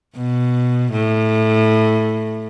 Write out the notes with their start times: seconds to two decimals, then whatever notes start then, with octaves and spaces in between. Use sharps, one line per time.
0.16 B2
0.91 A2